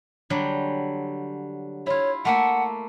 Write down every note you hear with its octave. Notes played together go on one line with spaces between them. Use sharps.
D3 F#3 G3
E4 F4 C#5
A3 A#3 E5 F#5